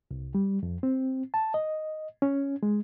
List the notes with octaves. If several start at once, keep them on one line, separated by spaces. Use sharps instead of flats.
C2
G3
F2
C4
A5
D#5
C#4
G#3